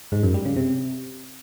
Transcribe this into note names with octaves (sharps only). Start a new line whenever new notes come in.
G#2
F#2
G3
C#3
C3